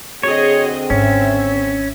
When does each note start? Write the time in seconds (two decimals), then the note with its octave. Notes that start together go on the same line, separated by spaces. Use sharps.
0.23 D3 C4 F#4 G#4 C#5 D#5
0.90 G#1 C#4 E5